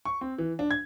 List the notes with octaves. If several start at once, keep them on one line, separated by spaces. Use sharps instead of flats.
C#6
C4
E3
D4
G#6